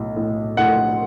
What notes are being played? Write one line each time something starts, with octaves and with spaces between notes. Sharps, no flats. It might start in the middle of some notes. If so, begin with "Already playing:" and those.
Already playing: B1 A2
A2
A2 F#5